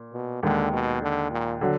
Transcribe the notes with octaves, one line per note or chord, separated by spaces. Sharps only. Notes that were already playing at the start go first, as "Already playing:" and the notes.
Already playing: A#2
B2
D#2 D3 D#3 G#3
B2
D3
A#2
D3 F#3